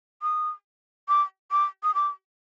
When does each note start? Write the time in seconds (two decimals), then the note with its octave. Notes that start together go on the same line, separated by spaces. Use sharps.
0.22 D#6
1.08 D6
1.51 D6
1.83 D#6
1.95 D6